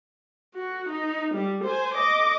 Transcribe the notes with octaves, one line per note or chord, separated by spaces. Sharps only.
F#4
D#4
G3
C5 G#5
D#5 D6